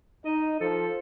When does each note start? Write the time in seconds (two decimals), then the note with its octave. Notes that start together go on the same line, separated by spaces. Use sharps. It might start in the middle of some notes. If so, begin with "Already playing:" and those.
0.25 D#4 D#5
0.61 F3 A4